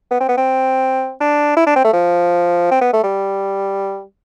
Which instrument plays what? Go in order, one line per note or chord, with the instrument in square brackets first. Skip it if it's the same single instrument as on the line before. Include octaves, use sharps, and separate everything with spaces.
[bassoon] B3
C4
B3
C4
D4
E4
D4
C4
A3
F3
C4
B3
A3
G3